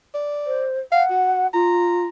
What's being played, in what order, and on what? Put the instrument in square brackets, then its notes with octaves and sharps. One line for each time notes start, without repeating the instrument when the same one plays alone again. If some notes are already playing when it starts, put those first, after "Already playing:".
[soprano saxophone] D5
[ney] C5
[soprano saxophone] F5 [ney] F#5
[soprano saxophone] F#4
[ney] F4 [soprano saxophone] A#5